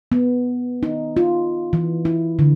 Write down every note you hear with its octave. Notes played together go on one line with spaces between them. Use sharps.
B3
D#4
F4
E3
E4
D3